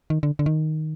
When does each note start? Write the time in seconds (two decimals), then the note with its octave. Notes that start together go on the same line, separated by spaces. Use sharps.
0.10 D#3
0.23 D3
0.39 D3
0.46 D#3